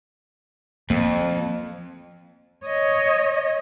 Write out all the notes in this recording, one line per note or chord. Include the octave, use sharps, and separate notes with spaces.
F2 A#3
C#5 D#5